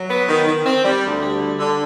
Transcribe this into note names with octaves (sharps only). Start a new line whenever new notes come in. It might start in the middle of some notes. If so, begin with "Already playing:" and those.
Already playing: F#3
B3
D#3
D#3
C4
G3
D2
G3
D3
D3